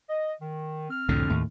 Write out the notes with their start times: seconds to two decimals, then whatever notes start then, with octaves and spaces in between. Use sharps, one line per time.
0.09 D#5
0.40 D#3
0.90 C4 F6
1.09 C2 F2 A2 D3
1.30 D#2 A2